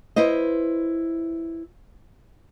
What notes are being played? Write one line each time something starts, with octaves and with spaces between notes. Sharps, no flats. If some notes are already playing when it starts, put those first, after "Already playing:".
E4 B4 C5 D#5